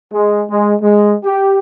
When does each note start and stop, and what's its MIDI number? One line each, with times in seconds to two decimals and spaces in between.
0.13 0.43 56
0.50 0.75 56
0.82 1.15 56
1.24 1.59 67